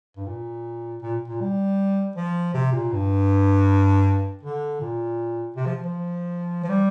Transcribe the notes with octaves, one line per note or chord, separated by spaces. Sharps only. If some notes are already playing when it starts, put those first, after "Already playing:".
G2
A#2
A#2
A#2
G3
F3
C3
A#2
G2
D3
A#2
C3
F3
F3
F3
G3